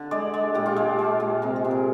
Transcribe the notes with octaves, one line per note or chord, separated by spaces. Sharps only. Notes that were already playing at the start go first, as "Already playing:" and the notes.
Already playing: D3
G#3 D5
G#3
A#2 G4
F4
G#3 G4
G#3
A#2
C3 A#4
G#4
C3
A#4